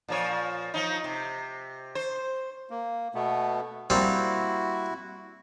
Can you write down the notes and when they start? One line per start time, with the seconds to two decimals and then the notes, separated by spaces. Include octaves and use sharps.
0.08 A#2 F3 C#5
0.74 F3 D#4
1.04 C3
1.95 C5
2.70 A#3
3.15 B2 A3 B3
3.90 G3 A#3 C4 E4 F#4